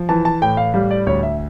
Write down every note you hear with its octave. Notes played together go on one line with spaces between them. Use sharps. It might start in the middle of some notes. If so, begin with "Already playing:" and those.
Already playing: F3
E3 A5
A5
A2 G5
F5
G3 F5
D5
D2 C#5
E5